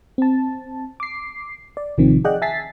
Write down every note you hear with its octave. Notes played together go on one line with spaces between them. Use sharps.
C4 A5
D6 C7
D5
A1 C3 D#3 F3 C4
G#4 D5 D#5 F#5 G5 F#6
E5 G#5 A5 A6 B6 C7